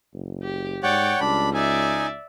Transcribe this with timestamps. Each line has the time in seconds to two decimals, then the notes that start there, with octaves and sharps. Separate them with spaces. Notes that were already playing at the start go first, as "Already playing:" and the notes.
0.14 F#1
0.43 G4
0.83 G#2 C#5 D5 F#5 G5
1.20 C#2 G3 D4 B5
1.54 D#4 D5 E5 G#5